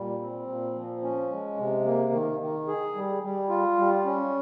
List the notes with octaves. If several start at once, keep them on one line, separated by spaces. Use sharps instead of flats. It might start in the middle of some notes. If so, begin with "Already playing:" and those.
Already playing: A#2 G3
C4
A#2
F3
C#4
G#3
C3
A#3
D#3
D#3
G#4
G3
G3
F4
G3
C#4